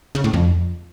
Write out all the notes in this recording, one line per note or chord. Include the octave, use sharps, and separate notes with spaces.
C#3
A2
F2